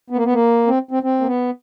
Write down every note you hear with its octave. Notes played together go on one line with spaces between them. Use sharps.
B3
A#3
B3
A#3
C4
C4
C4
A#3
B3